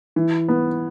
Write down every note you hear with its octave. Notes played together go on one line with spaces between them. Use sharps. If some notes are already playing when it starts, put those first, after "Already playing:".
E3
B3